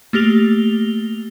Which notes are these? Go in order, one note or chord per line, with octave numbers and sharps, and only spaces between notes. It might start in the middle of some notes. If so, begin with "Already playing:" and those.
A3 A#3 G4 F7 G7